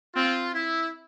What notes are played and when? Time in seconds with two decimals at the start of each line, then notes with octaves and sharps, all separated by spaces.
0.16 C4 F4
0.53 E4